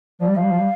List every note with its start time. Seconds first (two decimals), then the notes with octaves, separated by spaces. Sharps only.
0.21 F3 D5
0.29 G3
0.36 F3 F5
0.44 G3
0.51 F3
0.60 G3